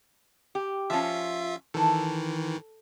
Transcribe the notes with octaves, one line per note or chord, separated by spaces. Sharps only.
G4
F3 C#4 F4 E5
D#3 E3 A4